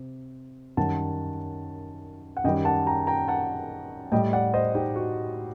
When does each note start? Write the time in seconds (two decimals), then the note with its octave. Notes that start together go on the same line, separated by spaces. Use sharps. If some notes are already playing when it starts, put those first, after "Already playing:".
Already playing: C3
0.77 F#2 D#3 G3 F#5 A5
2.37 F#5
2.44 F#2 D#3 G3 D#5 G5
2.65 F#5 A5
2.86 G5 A#5
3.07 G5 A#5
3.28 F#5 A5
4.12 A2 G3 D#5 G5
4.33 D5 F#5
4.54 C5 D#5
4.75 D#4 G4
4.96 F#4